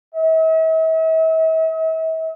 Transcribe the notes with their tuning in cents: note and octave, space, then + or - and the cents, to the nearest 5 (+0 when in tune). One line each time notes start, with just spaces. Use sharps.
E5 -45